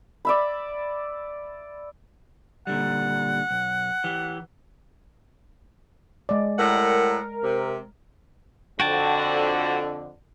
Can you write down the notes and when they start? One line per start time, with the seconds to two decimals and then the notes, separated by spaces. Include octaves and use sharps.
0.25 D5 E5 B5
2.67 A#2 D3 G3 F#5
3.51 B1
4.04 E3 G4
6.29 G#3 D5
6.59 A2 G3 A#4 F#5
7.42 C3
8.80 F2 D3 F#4 G5 A5